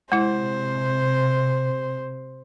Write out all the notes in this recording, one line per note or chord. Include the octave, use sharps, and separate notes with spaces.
C3 G#3 E4 C5